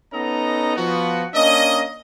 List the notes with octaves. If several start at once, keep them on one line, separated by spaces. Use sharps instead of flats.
B3 C#4 D#4 A4 D#5 A#5
F3 B3 F#4
A#3 C#4 D4 D#5